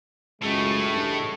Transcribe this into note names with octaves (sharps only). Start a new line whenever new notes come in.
C#2 F#2 A2 G#3 A3
A1 G2 G#3